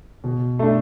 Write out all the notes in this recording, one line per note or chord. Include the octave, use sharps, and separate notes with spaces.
B2
A3 D4